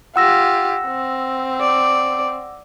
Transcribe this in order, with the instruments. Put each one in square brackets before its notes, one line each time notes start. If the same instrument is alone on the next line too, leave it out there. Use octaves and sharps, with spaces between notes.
[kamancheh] F4 G4 [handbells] F#5 E6 A#6
[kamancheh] C4
[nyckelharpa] D5